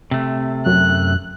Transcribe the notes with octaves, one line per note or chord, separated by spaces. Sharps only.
C3 A3
F#2 F#6